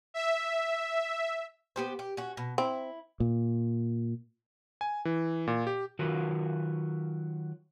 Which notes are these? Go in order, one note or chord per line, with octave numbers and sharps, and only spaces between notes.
E5
B3 G4 C5
G4
C#4 F#4
B2
C4 E4
A#2
G#5
E3
A#2
G4
D#3 F#3 F4 F#4 A#4 B4